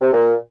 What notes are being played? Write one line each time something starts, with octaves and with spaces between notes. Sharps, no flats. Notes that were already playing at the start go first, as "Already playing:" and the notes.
C3
A#2